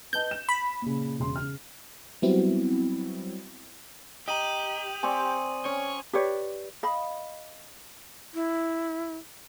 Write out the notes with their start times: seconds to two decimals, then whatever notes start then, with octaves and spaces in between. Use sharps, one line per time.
0.13 B4 D#5 A5 G6
0.31 E7
0.49 B5
0.82 A#2 C#3
1.19 E1 C#3 C6
1.36 C#3 F6
2.22 F#3 G3 B3 C4 E4 F#4
4.28 G4 D#5 A#5 D#6 D#7 F#7
5.03 C4 D5 G#5 C#6
5.65 C#4 C#5
6.13 G4 B4 C#5 D5
6.83 D#5 F5 B5
8.34 E4